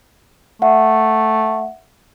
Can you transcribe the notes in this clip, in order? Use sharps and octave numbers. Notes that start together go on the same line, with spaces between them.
A3 E5 F#5